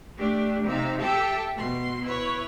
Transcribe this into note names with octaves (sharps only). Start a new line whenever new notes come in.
A3 D4 G4
C3 D#4 E5 F5
G4 A4 E5 G5 A5
B2 C6
E4 B4 C#5